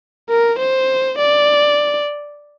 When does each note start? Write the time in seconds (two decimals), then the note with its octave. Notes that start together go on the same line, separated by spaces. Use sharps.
0.29 A#4
0.59 C5
1.18 D5